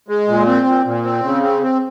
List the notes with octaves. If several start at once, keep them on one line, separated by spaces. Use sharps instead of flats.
G#3
A#2
C4
A#2
A#2
C4
C#3
C4
C4